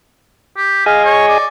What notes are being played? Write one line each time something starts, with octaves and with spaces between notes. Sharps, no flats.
G4
G#4 D#5 F5 G#5
C#5
D5